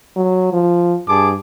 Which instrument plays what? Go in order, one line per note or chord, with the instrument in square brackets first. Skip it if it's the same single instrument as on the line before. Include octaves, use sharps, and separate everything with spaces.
[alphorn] F#3
F3
[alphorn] G2 [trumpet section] G#4 A5 D6